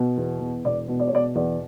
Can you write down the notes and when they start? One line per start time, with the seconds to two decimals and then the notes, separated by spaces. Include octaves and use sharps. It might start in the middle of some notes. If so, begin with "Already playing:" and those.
Already playing: B2
0.17 E2
0.41 E2
0.65 E1 D5
0.88 B2
1.00 D5
1.07 C#5
1.11 B2 D5
1.35 E2 D5